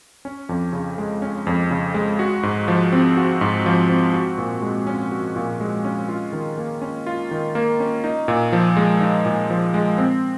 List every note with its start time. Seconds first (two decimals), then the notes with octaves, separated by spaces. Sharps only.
0.25 C#4
0.49 F2
0.73 C#3
0.98 G#3
1.22 C#4
1.47 F2
1.71 C#3
1.94 G#3
2.19 F#4
2.43 G#2
2.68 F3
2.92 C4
3.17 F#4
3.41 G#2
3.66 F3
3.89 C4
4.14 F#4
4.38 A#2
4.62 G#3
4.87 C#4
5.12 F#4
5.36 A#2
5.60 G#3
5.85 C#4
6.09 F4
6.33 D#3
6.58 A#3
6.82 C#4
7.06 F4
7.31 D#3
7.55 A#3
7.80 C#4
8.04 D#4
8.28 A#2
8.53 F3
8.77 G#3
9.01 D#4
9.26 A#2
9.50 F3
9.74 G#3
9.98 C4